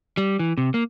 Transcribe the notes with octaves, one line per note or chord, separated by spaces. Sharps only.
G3
E3
C3
A#3